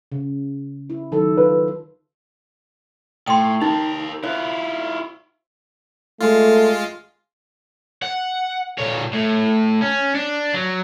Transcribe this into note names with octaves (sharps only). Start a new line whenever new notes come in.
C#3
E4
D#3 F#3 A4
F4 B4
A2 G5 C6
D#4 G4 A#4
E4 F4 C5
G#3 A3 F4
F#5
A#2 C#5
A2
C#4
D4
F#3